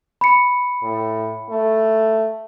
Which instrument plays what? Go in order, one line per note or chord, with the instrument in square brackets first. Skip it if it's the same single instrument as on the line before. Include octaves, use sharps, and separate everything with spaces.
[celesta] B5 C#7
[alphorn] A2
A3